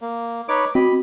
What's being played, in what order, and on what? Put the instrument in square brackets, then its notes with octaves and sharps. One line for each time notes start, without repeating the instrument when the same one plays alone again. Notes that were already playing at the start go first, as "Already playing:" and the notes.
[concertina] A#3
[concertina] D#4 B4 C#5 [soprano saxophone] D6
[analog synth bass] C4 [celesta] F#4 [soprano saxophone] D#5 [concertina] B5